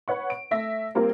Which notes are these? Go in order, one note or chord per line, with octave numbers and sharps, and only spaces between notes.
B4 C#5 F#5 C#6
D7
A3 E5 A#6
G3 A#3 C4 F4 A#4